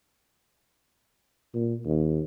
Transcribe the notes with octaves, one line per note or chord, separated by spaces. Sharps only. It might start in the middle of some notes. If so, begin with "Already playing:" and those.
A#2
D#2